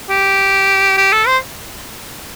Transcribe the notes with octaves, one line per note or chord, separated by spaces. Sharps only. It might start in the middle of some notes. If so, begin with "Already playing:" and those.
G4
G4
A4
C5